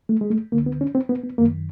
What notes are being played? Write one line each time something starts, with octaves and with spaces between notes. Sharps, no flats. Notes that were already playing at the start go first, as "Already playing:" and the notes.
A3
G#3
A3
D2 D3 A#3
B3
C#4
C4
B3
B3
F#2 D#3 A#3